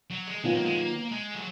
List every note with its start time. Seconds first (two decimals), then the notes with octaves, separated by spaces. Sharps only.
0.10 F#3
0.27 G#3
0.44 D#3 F#3 G#3 B3 F4
0.55 A#3
0.66 G#3
0.78 A#3
1.12 G#3
1.35 F#3